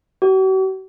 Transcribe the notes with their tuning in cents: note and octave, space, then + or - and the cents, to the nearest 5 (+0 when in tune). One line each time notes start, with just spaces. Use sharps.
F#4 +45